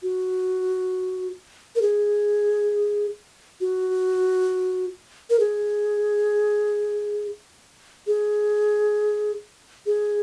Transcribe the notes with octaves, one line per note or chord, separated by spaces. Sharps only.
F#4
A#4
G#4
F#4
A#4
G#4
G#4
G#4